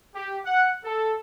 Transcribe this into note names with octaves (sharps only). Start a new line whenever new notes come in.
G4
F#5
A4